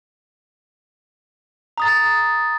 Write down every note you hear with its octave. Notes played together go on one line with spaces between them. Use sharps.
A#5 D#6 A6